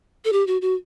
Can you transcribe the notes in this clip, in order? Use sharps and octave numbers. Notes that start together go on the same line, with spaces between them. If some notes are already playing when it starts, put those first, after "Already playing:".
A4
G4
F#4
F#4